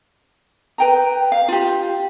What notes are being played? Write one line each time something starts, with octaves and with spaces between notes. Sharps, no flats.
B4 G5 A#5
F5
F4 G4